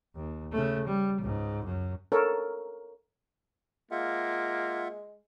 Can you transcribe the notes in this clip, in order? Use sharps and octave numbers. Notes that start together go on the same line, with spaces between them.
D#2
C#3 A3
G3
C#2 G#2
F#2
A4 A#4 C#5
G#3 A#3 F4 E5 F#5